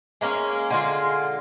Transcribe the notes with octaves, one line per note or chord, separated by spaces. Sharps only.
G#3 A#3 C#4
D3 G#3 F4